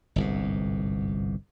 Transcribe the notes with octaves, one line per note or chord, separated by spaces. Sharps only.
G1 C2 G#2